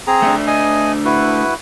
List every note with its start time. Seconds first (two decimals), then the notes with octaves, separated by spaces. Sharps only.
0.07 C4 G#4 A#5
0.22 A3 D4
0.47 D#5 G#5
1.05 E4 F#4 B4